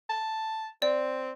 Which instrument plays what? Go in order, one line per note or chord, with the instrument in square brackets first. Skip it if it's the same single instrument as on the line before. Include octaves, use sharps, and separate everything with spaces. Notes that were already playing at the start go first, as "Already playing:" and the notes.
[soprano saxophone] A5
[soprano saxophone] C4 [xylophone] D5